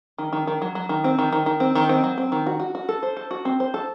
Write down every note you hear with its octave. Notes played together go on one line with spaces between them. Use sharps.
D#3
D#3
D#3
F#3
F#3
D#3
C4
D#3
D#3
D#3
C4
D#3
C4
F#3
C4
D#3
F#4
F#4
F#4
A4
C5
A4
F#4
C4
C5
A4